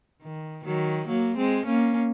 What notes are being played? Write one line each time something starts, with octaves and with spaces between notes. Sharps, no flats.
D#3
D#3 F#3
F#3 A#3
G#3 C4
A#3 C#4